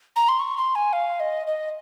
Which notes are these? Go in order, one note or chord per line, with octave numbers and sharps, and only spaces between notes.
A#5
C6
C#6
C6
G#5
F5
D#5
D#5